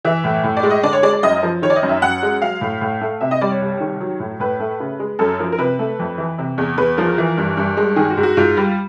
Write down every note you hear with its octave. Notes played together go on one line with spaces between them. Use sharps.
E3 E5
A2
A2
D5
G#3
D#5
D3 D5
C#5
G#3 D5
D5
F#2 D#5
D#5
F3
D#3 C#5
D5
D#5
F#2
E5
F#2 F#5
G#3
F#3 F5
A2
A2
A3
C3 E5
D#5
G3 D5
C#5
C2
D#3
F#3
A2
A2 B4
A3
C#3
G#3
F#2 A4
F3 A#4
A#4
C3 B4
A3
F2
E3
C3
E2
E2 B4
F3 A#4
E3
G2
G2
G#3
D#3 G#4
F#4
G#2
F#4
G#2 F4
G3